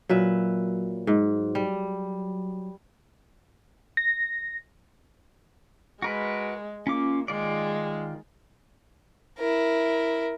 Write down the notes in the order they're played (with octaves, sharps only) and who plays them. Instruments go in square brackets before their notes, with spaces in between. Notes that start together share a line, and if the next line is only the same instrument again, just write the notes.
[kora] A#2 B4 E5 [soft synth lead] F#3
[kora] G#2
G3
[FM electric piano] A#6
[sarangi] G#3 [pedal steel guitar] F#4 A#4 B4
[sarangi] A#3 [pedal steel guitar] C#4 F4 D6
[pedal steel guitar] D#3 F4 D5 [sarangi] G#3
[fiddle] E4 A#4